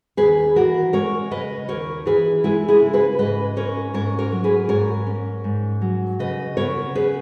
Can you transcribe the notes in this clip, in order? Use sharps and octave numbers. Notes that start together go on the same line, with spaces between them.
D#2 G#4 B4
E3 F#4 A#4
G#3 A#4 C#5
C#3 B4 D#5
D#2 A#4 C#5
E3 G#4 B4
G#3 E4 G#4
E4 G#4
C#3
G#4 B4
G#2 B4 D#5
C#4 A#4 C#5
G#2 A#4 C#5
A#4 C#5
F#3
G#4 B4
G#2 A#4 C#5
C#4
G#2
F#3
C#3 B4 D#5
B3 A#4 C#5
C#3 G#4 B4